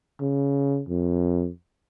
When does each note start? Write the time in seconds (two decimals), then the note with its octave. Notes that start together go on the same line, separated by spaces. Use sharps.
0.21 C#3
0.89 F2